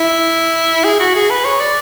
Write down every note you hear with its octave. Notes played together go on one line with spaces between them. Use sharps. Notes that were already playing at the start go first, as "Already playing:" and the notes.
Already playing: E4
G#4
F#4
G#4
B4
C#5
D5